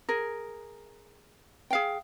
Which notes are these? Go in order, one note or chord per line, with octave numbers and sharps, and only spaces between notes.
G#4 A#4
G#4 F5 G5